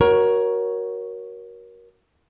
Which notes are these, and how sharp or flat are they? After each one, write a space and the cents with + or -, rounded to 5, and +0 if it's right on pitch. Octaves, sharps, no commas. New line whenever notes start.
F#4 +5 A#4 +20 C#5 +0